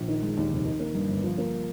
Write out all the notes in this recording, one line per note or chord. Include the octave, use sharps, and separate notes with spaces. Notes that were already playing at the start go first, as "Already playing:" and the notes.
Already playing: A#1
D#3
G#3
D#2
F1
D#3
A#3
G2
G1
F3
A#3